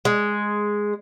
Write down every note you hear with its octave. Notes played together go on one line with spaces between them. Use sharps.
G#3